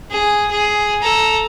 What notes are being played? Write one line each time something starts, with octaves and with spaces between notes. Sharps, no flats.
G#4
G#4
A4 A#5